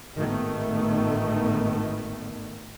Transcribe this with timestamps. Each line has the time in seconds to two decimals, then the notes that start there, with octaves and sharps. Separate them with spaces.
0.15 G#1 A2 D#3 A3 B3